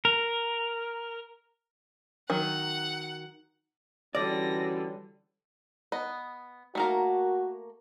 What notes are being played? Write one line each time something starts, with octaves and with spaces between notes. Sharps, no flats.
A#4
D#3 F#3 F#5
D3 E3 G3 C#4 F#4 D5 A#6
B3 D#5
A3 A#3 F#4 A#4